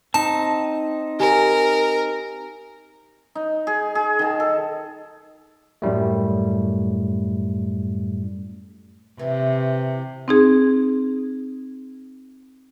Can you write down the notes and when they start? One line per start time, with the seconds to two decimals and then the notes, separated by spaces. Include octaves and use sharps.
0.14 C4 D#4 A5
1.20 G4 A#4 G#5
3.35 D#4
3.67 G#4
3.95 G#4
4.19 D#3 A5
4.40 A4
5.82 F#2 A2 G3 A3
9.19 C3 E3
10.28 C4 D#4 G#4